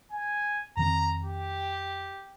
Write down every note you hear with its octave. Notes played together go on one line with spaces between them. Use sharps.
G#5
F2 D#3 C4 A#5
G4